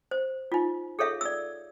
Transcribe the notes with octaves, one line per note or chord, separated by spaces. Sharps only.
C5
D#4 F4
G#4 A4 C#5 E5 F5
D5 E6